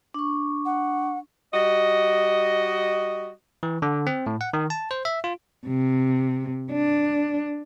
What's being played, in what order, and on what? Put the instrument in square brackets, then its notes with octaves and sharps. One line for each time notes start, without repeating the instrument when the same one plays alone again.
[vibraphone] D4 C#6
[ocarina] F#5
[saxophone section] G3 F#4 D#5
[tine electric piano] E3
D3
C4
A2
F#5
D#3
A5
C5
E5
F4
[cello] C3
D4